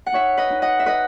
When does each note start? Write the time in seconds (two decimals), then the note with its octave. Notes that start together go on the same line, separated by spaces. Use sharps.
0.06 F#5
0.13 D#4 C#5 E5
0.37 B4 D#5
0.50 D#4
0.62 D#5 F#5
0.79 E5
0.86 B4 D#5